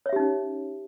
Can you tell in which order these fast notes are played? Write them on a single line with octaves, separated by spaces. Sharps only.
C#5 E5 G4 D#4 C#4